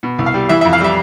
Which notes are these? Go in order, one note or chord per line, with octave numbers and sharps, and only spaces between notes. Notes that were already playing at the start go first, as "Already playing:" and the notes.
B2
C2
F5
G3
E3 E5
F2 E5
F5
G3 E5